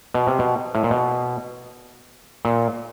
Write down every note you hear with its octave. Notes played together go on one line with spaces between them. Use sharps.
B2
C3
B2
A2
A#2
B2
A#2